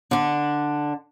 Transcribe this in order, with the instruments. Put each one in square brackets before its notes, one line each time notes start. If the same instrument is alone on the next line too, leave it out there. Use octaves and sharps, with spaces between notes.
[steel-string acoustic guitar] D3 D4